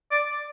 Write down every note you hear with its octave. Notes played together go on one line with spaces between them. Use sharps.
D5